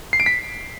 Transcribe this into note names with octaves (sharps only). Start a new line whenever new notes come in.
C7
D7
B6